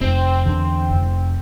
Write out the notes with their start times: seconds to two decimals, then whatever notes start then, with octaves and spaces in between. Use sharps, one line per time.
0.01 F1 C4
0.46 E2 D3
0.89 F1